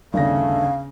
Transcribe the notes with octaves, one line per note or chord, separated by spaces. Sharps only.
G1 D#2 C#3 A3 D4 F5 A#6